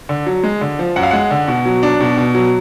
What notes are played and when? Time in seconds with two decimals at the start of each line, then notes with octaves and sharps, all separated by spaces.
0.09 D3
0.27 F#3
0.43 G#3
0.61 D3
0.79 F3
0.96 F#2 F#5
1.03 F5
1.11 G#3 F#5
1.31 D3
1.48 B2
1.66 F#3
1.83 D4
2.00 B2
2.17 B2
2.35 F#3